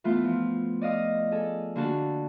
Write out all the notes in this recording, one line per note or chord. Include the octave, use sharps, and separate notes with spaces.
E3 A3 B3 F4
F3
D5 D#5 F5 D#6
G#4 A4
D3 A#3 D4 F#4 A5